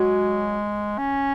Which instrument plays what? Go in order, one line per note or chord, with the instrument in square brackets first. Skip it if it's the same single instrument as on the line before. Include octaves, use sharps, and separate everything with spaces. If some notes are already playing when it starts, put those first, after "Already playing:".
Already playing: [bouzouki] F#3 C#4 F#4 [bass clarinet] G#3
[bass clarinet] C#4